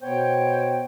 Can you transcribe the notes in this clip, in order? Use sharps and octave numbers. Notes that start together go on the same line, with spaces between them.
B2 B3 C5 C#5 G5